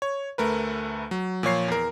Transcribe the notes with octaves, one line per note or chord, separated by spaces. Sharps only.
C#5
D2 A3 A#4 B4
F#3
A#2 F3 C#5 C7
E2 A#4